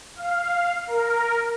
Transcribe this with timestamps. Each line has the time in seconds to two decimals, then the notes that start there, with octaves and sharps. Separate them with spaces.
0.16 F5
0.87 A#4